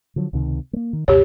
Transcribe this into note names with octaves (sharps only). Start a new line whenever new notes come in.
D3 F3 F#3
C#2 C3 D#3
A3 A#3
D#3
C#2 F#2 B2 G4 C#5